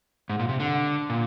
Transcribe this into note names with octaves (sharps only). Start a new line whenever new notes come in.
G#2
A#2
C3
D3
A#2